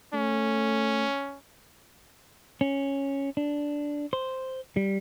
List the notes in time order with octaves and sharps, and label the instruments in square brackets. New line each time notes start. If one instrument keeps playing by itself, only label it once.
[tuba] A3 [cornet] C#4
[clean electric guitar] C#4
D4
C5
G3